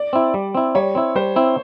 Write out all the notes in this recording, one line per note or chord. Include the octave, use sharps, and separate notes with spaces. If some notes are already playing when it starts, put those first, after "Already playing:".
Already playing: D5
C4 E4
G3
C4 E4
G3 C#5
C4 E4
G3 C5
C4 E4